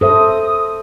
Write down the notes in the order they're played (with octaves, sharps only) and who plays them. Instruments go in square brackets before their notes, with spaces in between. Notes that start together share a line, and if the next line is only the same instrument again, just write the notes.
[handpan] A4 C5 E5 [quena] D#6